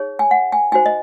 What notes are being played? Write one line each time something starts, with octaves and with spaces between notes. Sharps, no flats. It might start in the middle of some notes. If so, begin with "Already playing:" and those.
Already playing: D#4 G#4 C#5
G#5
F#5
G#5
D#4 F#4 C5 G#5
D#5